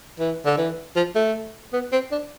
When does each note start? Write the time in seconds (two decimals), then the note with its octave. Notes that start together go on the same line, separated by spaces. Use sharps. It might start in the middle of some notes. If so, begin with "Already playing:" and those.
0.19 E3
0.45 D3
0.57 E3
0.96 F3
1.15 A3
1.73 B3
1.92 C4
2.11 D4